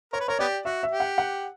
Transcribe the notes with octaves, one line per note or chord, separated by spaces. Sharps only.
A#4 C#5
B4
A#4 C#5
B3 G4 D5
F#4 E5
E5
G4
F#5
F#5